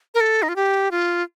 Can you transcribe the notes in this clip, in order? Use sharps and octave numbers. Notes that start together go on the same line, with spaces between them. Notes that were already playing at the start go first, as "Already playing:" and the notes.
A#4
A4
D#4
F4
G4
F4